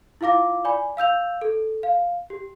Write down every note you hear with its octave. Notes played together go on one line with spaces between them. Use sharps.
E4 F4 F5 D6 A#6
D5 G#5 B5
F5 E6 G6 F7
A4
F5
G4